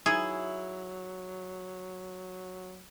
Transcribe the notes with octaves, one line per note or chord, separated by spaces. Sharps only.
E3 F#3 D#4 E4 G#4